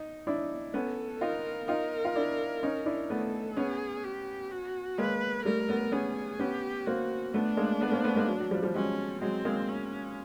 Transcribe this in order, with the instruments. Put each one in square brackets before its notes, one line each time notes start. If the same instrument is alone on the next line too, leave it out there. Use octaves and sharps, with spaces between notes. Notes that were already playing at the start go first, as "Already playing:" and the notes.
Already playing: [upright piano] D#4
D4 E4
[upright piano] B3 C#4 [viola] A4
[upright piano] D#4 F4 [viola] A#4
[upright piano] D#4 F4 [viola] A#4
[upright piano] F4
D4 E4
C#4 D#4
D4 E4
[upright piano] A3 B3 [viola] A4
[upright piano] B3 C#4 [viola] G#4
[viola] G4
F#4
[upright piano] G#3 A#3 [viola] B4
[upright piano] G3 A3 [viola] A#4
[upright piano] A3 B3
[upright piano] B3 C#4 [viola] G#4
[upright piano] B3 C#4 [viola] G4
[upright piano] A#3 C4 [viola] F#4
[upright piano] A3 B3 [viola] D4
[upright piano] G#3 A#3
A3 B3
A#3 C4
A3 B3
G#3 A#3
F#3
F#3
F3 G3
F3 G3
[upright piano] F#3 G#3 [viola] C#4
[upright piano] F#3 G#3 [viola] C4
[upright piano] G#3 A#3
[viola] C#4